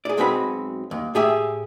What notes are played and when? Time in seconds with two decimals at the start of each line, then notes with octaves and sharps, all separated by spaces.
0.05 G#4 D5
0.17 B1 G#3 C4 F#4 B4 B5
0.91 D#2
1.15 A2 G4 G#4 E5